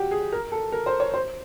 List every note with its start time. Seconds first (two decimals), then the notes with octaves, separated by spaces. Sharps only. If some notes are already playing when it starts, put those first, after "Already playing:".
Already playing: F#4 G4
0.11 G#4
0.32 A#4
0.52 A4
0.72 A#4
0.86 C5
1.00 C#5
1.14 C5